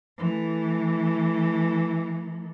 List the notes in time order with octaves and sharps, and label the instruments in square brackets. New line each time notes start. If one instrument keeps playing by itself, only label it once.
[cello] E3 A3